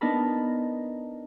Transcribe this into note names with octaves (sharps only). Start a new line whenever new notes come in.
B3 D4 D#4 A#4 A5 B5